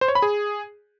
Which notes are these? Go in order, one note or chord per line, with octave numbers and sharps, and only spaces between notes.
C5
C#5
B5
G#4